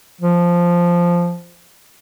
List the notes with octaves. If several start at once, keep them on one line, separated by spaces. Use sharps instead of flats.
F3